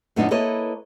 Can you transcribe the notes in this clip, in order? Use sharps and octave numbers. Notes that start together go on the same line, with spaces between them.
F#2 A#2 D3 B3 D4 D#4
A#3 E4 A4 B4 C#5 D#5